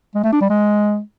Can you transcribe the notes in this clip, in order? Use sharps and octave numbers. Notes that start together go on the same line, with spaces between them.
G#3
A3
D4
G3
G#3